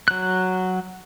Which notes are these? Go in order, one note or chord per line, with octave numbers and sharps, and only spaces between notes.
F#3 F#6